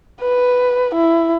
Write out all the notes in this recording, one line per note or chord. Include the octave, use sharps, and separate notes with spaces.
B4
E4